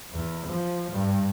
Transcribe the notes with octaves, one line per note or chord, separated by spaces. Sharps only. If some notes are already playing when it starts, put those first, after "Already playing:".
E2
F3
G2